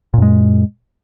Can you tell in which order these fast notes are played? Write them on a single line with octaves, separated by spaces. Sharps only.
A#2 F#2 G#3